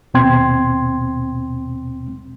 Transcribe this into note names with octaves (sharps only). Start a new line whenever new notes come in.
D#2 B2 C4 G5 C6 G#6